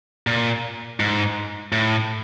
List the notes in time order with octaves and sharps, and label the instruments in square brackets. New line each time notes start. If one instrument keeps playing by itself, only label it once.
[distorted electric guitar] A#2
G#2
A2